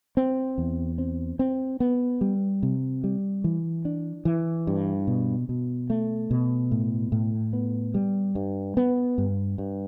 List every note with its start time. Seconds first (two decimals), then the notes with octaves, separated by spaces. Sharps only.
0.17 C4
0.58 E2
0.98 C4
1.39 C4
1.80 B3
2.21 G3
2.63 C3
3.04 G3
3.44 E3
3.85 D4
4.25 E3
4.67 G2
5.07 B2
5.49 B2
5.90 A3
6.31 B2
6.71 A2
7.12 A2
7.53 B3
7.94 G3
8.35 G2
8.77 B3
9.18 G2
9.58 G2